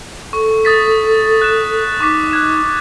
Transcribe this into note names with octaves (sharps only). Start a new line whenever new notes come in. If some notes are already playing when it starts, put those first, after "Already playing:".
A4 C#6
D#6 A6 B6
F#6 E7
D#4 C#6 D6 B6
F#6 G#6 E7